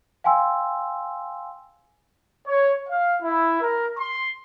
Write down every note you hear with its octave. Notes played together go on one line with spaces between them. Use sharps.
F5 G5 G#5 C6 E6
C#5
F5
E4
A#4
C6